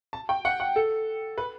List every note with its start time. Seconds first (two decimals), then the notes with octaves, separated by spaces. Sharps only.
0.13 A5
0.29 G5
0.45 F#5
0.60 F#5
0.76 A4
1.38 B4